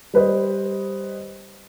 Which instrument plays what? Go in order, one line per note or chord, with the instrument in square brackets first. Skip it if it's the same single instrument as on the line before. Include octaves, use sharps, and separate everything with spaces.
[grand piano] G3 B4 C5 D#5